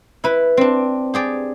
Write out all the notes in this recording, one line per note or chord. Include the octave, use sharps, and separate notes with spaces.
E4 B4
C4 D4
G4 G#4 D5